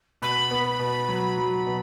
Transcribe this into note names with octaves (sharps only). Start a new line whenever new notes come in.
B2 B5
B3
B2
F#3
F#3
B2